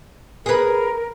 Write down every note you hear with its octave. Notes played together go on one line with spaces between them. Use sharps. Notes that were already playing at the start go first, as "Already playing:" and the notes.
G#4 A#4 B4